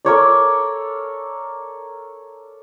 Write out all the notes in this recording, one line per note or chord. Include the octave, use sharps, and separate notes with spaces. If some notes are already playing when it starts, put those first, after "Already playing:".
A4 A#4 C#5 D5